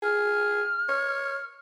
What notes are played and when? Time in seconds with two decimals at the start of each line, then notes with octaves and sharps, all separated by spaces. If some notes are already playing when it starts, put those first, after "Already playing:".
0.03 G#4 F6
0.89 C#5